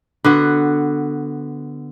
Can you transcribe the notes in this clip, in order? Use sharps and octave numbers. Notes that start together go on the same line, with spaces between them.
D3 B3 F#4